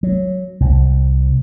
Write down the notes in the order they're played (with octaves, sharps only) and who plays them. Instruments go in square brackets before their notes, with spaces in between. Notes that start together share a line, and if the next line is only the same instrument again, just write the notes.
[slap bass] F#3
C2